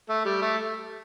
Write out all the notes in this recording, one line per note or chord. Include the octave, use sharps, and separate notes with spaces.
A3
G3
A3